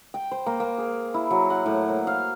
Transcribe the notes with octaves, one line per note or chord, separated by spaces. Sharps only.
G5
C5
A#3
A#3
G#4
E4
F#3
F#5
A2
A#3
F5